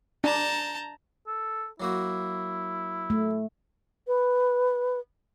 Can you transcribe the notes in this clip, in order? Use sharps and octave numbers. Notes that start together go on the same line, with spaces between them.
D4 A5 A#5 G6
A4
F#3 A#3 E4 F#4
A3
B4